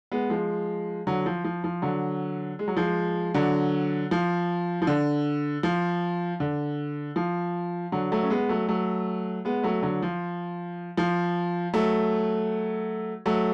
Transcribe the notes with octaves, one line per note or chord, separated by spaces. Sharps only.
G#3 B3
F3 G#3
D3 F#3
F3
F3
F3
D3 F#3
G#3
F#3
F3 G#3
D3 F#3
F3
F3
D3
F3
D3
F3
D3 F#3
F#3 A3
C#4
G#3 B3
F#3 A3
F#3 A3
G#3 B3
F#3 A3
D3 F#3
F3
F3
F#3 A3
F#3 A3